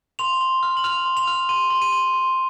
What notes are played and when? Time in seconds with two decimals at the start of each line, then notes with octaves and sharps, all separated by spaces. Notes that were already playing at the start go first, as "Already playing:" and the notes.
0.19 C6 F7
0.41 C6
0.63 F6
0.77 F#7
0.84 F6 F7
1.05 C6
1.17 F7
1.27 F6
1.49 C6 D#7
1.70 C6
1.82 D#7
1.93 C6
2.14 C6